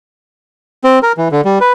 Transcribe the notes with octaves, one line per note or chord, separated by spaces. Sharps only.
C4
A#4
E3
D3
G3
B4